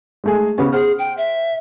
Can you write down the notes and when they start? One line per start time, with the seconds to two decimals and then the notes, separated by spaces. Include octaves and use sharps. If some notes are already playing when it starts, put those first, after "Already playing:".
0.24 G#3 A3 G#4
0.58 C#3 B3 C#4 G4
0.72 G#4 C5 F#5 F6
0.99 G5
1.17 E5